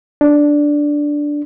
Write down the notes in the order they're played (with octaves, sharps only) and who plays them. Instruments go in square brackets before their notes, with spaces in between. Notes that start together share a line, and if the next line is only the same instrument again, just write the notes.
[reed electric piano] D4